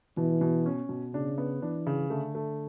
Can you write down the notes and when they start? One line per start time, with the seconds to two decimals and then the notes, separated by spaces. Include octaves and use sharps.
0.17 B2 E3
0.41 B2
0.66 C#4
0.89 B2
1.14 C#3 D4
1.38 B3
1.62 E3 D4
1.86 C#3
2.10 D3 A3
2.35 A3